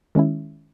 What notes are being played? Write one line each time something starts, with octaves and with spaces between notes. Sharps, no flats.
D#3 G#3 C#4 E4